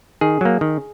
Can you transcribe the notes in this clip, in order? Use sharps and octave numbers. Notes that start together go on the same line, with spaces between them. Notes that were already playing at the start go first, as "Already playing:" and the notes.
D#3 G#4
F#3 A#3
D#3